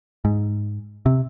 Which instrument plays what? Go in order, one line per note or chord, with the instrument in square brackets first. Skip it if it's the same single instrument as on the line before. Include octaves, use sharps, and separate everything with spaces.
[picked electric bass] G#2
C3